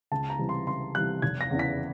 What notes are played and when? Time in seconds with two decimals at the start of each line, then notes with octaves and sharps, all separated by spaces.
0.12 C#2 A5
0.30 A#5
0.39 C3 E3 G3
0.49 C6
0.67 C#2 C6
0.95 C3 E3 G3 F#6
1.22 F1 G#6
1.41 A#6
1.51 E2 C#3 E3
1.59 B6